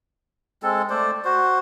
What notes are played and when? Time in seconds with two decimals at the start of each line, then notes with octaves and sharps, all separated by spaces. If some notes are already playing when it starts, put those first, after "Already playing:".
0.63 G#3 C4 A4
0.90 A3 C5 D5
1.24 F#4 C5